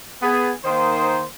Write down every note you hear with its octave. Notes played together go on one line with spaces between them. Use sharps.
B3 G#4
D#3 A#3 D#4 C5